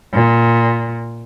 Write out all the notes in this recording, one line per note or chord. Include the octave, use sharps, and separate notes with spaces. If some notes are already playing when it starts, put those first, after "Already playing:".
A#2